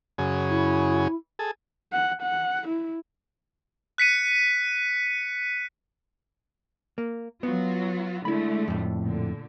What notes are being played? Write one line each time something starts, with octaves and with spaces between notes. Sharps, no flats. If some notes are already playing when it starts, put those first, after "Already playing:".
F#2 C#3 G#4
E4
G#4 A4
F#5
F#5
E4
F#6 B6 C#7 D#7
A#3
F#3 B3 F4 F#4
D3 G#3 A3 E4 B5
F2 A2
A#2 D3